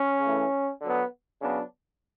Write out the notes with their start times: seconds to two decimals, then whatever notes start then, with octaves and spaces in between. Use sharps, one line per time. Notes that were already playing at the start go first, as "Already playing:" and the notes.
Already playing: C#4
0.21 C#3 E3 A3
0.80 D3 F#3 B3
1.39 C#3 F#3 B3 D4